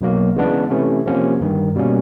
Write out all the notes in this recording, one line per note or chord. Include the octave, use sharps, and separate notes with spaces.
B1 B2 F#3 A#3
C#3 E3 G#3 B3 D4
C3 E3 A3 C#4
C3 F3 A#3 C#4
G1 G2 D#3
B2 G3 A#3 C#4